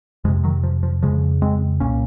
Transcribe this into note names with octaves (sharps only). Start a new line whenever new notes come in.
F2 C3 F3 G#3
D#3 F#3
F3
F3
F2 C#3 F3 G#3
G#3 C4
C2 A#2 A#3 C#4